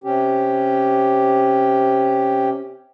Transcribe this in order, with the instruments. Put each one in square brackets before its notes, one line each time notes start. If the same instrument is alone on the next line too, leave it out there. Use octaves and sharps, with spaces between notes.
[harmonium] C3 C#4 G4